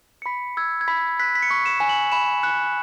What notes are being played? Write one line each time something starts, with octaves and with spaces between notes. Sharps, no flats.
C#7
B5 B6
E6 G#6
G#6
B5 B6
F#6 B6
B6
C#7
C#6
E7
G#5
F#7
B5 E7
F#6 C#7